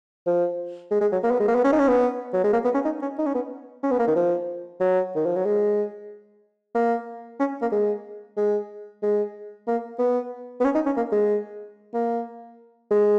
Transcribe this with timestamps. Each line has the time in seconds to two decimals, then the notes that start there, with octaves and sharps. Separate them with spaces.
0.26 F3
0.91 G#3
1.01 G#3
1.12 F#3
1.23 A#3
1.31 B3
1.40 G#3
1.48 A#3
1.55 B3
1.64 C#4
1.72 D#4
1.79 C#4
1.88 B3
2.33 F#3
2.44 G#3
2.53 A#3
2.64 B3
2.74 C#4
2.85 D#4
3.02 C#4
3.18 D#4
3.26 C#4
3.35 B3
3.83 C#4
3.91 B3
3.99 A#3
4.07 D#3
4.15 F3
4.80 F#3
5.16 D#3
5.26 F3
5.36 F#3
5.45 G#3
6.75 A#3
7.40 C#4
7.62 A#3
7.72 G#3
8.37 G#3
9.02 G#3
9.67 A#3
9.99 B3
10.60 B3
10.64 C#4
10.74 D#4
10.86 C#4
10.97 A#3
11.12 G#3
11.94 A#3
12.91 G#3